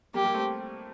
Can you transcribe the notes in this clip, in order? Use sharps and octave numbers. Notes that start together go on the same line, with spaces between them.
G3 A#3 G4
G3 A#3
A3 C4